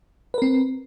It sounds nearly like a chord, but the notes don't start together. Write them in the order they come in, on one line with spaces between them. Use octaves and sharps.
B4 A#4 C4